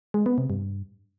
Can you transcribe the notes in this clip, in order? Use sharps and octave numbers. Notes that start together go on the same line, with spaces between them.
G#3
B3
C3
G2